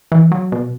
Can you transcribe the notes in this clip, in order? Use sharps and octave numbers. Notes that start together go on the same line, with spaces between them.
E3
F#3
B2